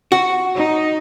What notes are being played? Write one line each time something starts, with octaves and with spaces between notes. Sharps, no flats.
F#4
D#4